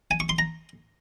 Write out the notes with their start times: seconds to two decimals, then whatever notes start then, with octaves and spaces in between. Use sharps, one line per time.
0.11 G#5
0.20 C#6
0.29 C6
0.39 A#5